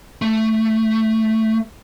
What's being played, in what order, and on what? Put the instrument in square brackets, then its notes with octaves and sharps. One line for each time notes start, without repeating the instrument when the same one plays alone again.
[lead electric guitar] A3